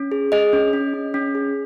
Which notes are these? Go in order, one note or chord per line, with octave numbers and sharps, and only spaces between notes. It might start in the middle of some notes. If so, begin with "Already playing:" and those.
Already playing: C#4
G#4
G#4 D#5
C#4
C#4
C#4
C#4
G#4